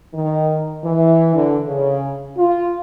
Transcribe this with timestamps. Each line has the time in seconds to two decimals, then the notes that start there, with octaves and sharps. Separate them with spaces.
0.14 D#3
0.84 E3
1.35 D3
1.66 C#3
2.38 F4